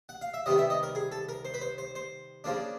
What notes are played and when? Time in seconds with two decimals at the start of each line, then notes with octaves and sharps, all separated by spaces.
0.09 F#5
0.21 F5
0.34 E5
0.46 C3 D#3 G3 B3 D#5
0.58 E5
0.70 D#5
0.83 A#4
0.95 G#4
1.12 A4
1.29 A#4
1.45 C5
1.54 B4
1.61 C5
1.78 C5
1.95 C5
2.44 C#3 F3 A#3 D4